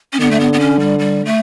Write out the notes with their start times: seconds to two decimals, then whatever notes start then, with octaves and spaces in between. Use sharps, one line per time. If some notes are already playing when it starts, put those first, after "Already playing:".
0.13 C#4
0.20 D3 B3
0.31 A3
0.40 B3
0.53 B3
0.60 C#4
0.80 G3
0.99 G3
1.25 A3